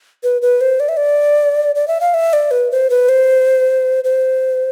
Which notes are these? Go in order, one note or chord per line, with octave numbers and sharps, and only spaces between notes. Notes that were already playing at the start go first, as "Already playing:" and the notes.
B4
B4
C5
D5
E5
D5
D5
E5
F5
E5
D5
B4
C5
B4
C5
C5